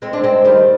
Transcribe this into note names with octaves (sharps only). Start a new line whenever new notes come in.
G#3 C4
D4
G#3 C4
D#3 G3